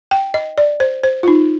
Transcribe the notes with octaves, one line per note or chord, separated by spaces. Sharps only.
G5
D#5
D5
C5
C5
F4
D#4